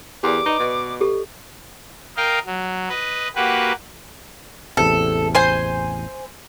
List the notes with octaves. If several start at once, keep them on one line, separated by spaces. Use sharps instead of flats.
E2 G4 A#4 D5 D6
D#4 B4 D5 D#5
B2
G4 A4
A#4 D#5 F5 G5
F#3
B4 D#5
A#3 F#4 G4 B4
A1 E2 C3 A4
C5 G#5 C6